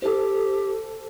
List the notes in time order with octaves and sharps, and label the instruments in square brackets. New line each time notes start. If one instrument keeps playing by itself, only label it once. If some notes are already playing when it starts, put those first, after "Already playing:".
[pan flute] G4 [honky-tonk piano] A4 C5